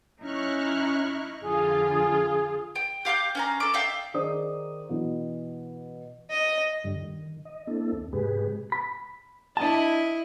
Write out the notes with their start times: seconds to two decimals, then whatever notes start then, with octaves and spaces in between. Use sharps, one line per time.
0.21 C#4 D#4 E4 C#6 F6 F#6
1.42 F2 D3 F4 G#4 G#5
2.76 G5
3.05 G4 F5 D6 G6
3.35 C#4 F5 A#5
3.60 A4 D6
3.73 D#4 E5 F5 G5
4.14 D#3 D#4 G#4 C5 D5 D#6
4.89 B2 E3
6.31 D#5
6.84 G2 D3 G3
7.02 D#3
7.45 D#5
7.67 A#3 C4 D4 E4 A4
7.92 D#2
8.13 G#2 C3 G#3 G4 G#4 B4
8.72 B5
9.57 D4 E4 D#5 A5